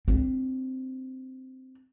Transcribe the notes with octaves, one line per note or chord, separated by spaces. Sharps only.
C4 D4